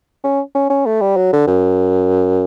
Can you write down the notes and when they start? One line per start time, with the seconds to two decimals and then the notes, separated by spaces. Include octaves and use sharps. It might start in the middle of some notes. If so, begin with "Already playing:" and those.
0.24 C#4
0.55 C#4
0.70 C#4
0.86 A3
1.01 G3
1.17 F#3
1.33 D3
1.48 F#2